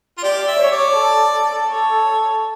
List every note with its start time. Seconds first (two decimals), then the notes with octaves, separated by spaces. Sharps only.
0.17 F4
0.23 G4 D5
0.47 E5
0.59 C#5
0.72 D5
0.96 A4
1.68 C#5